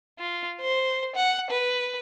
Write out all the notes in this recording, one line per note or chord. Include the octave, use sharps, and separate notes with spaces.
F4
C5
F#5
B4